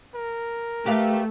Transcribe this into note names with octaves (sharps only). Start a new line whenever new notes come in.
A#4
A3 G4 B4 F5